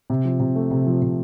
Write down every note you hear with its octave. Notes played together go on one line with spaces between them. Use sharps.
C3
F3
C3
A3
C3
F3
C3